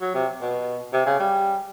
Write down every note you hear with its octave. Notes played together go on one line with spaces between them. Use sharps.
F#3
C3
B2
C3
C#3
G3